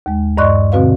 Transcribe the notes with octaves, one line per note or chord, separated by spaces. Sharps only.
D#2 G#3
G2 D5 D#5 C6 C#6 F#6
B2 D3 C4 F#4 B4 F5